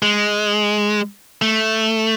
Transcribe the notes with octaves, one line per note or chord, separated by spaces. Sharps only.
G#3
A3